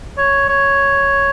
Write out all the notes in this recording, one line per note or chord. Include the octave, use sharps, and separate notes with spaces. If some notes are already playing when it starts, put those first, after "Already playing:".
C#5
C#5